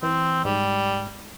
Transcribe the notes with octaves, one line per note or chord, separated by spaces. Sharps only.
E3 C4
G#2 G3